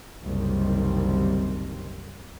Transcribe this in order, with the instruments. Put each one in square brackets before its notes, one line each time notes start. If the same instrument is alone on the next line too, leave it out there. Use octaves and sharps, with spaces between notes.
[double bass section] F#1 C2 D#3 G3 C4